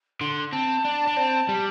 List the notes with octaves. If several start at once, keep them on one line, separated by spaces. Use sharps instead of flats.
D3 C6
C4 A5
D4
D4
C4
G3